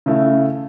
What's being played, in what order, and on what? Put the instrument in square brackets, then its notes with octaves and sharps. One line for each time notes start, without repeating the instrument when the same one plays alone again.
[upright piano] C#3 A3 E4